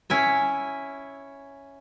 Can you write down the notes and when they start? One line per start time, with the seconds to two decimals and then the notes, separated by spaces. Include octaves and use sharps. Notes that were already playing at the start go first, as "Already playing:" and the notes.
0.10 C#4 E4 E5